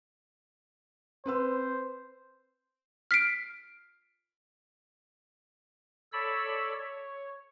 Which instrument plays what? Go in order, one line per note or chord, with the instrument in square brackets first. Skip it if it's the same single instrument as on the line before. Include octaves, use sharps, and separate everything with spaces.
[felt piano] C4 B4 E6 [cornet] C5
[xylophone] F6 B6 C7 D7
[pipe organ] A4 C#5 D5 B5 E6
C#5